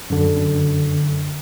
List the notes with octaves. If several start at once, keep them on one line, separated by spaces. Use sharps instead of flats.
F#2 D3